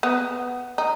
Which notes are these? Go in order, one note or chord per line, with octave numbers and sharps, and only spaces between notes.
B3
D#4